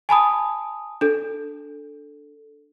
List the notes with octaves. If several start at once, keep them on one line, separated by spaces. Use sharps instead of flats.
G#5 A5 B5 D#6
D4 A4